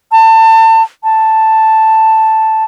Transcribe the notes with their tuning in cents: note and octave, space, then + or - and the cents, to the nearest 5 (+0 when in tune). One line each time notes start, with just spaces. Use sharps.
A5 +30
A5 +0